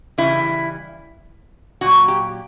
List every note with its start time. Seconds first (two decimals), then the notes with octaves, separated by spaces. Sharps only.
0.18 C#3 E3 G3 E4
1.81 A#2 F#3 F#4
2.08 G4